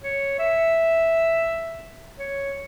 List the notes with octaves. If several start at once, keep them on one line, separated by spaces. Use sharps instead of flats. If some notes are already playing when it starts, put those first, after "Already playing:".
C#5
E5
C#5